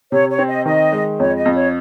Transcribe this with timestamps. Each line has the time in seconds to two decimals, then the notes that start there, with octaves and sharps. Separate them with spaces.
0.12 C3 C#5
0.30 C#5
0.39 C4
0.48 D#5
0.65 D#3 D#5
0.92 G#3
1.19 F2 C#5
1.36 D#5
1.45 F2
1.55 C#5